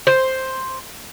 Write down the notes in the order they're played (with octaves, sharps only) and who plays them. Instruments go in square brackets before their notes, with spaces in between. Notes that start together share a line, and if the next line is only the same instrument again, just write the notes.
[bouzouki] C5